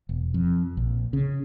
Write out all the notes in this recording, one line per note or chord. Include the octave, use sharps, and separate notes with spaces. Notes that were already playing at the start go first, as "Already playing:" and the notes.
E1
F2
A#1
C#3